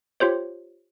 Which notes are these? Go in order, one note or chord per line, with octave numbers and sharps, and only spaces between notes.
F4 G4 C5 C#5